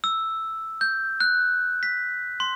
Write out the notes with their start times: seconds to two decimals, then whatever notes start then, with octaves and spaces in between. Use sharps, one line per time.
0.04 E6
0.81 G6
1.20 F#6
1.83 B6
2.40 C6